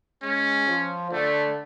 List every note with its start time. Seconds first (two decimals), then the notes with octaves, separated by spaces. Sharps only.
0.22 G#3 C#4
0.67 F3
1.12 D3 A3